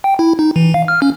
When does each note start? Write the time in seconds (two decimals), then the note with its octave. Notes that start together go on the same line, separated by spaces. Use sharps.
0.04 G5
0.19 E4
0.39 D#4
0.56 E3
0.74 F5
0.88 F6
1.02 C#4